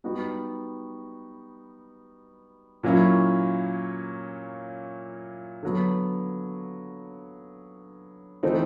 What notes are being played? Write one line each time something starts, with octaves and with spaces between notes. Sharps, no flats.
G3 B3 D#4 F#4
A#2 F#3 A#3 C#4 E4
D3 F#3 B3
E3 A3 C4 D#4